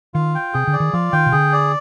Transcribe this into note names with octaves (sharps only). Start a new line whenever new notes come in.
D#3 F4
G5
C3 G#4
D3
D5
D#3
F3 F4
D#3 G5
C3
D3 G#4
D5